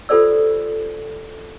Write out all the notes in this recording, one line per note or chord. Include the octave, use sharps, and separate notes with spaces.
F4 G4 A4 C5 D5 E6